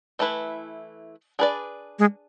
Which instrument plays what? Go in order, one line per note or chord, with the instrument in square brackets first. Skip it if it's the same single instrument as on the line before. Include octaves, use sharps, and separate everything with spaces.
[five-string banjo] E3 A3 E4 B4
D4 G#4 B4 D5
[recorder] G#3